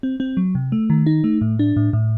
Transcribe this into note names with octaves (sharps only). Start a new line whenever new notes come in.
C4
C4
F#3
C3
A3
D#3
D#4
A3
A2
D4
A2
A2